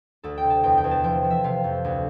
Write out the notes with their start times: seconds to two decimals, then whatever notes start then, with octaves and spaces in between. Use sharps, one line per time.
0.23 D2 A4
0.38 G5
0.44 C3
0.50 A5
0.63 E2 G5
0.78 G5
0.84 E2
0.91 A5
1.04 F3 G5
1.24 F3
1.30 E5
1.44 C3 F5
1.64 F2
1.84 D2